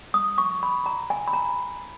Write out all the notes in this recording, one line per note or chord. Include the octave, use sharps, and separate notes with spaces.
D#6
C#6
B5
A#5
G#5
B5
A#5